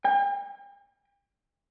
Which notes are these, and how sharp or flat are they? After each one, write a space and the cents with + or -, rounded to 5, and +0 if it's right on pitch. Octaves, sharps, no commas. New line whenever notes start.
G5 +45